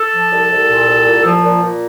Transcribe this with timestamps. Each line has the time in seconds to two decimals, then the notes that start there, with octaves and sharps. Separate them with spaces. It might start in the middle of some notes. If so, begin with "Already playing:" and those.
Already playing: A4
0.12 F3
0.31 C2
0.50 C2
0.69 A#2
0.87 C2
1.06 A#2
1.25 F3
1.44 A#2
1.63 A#2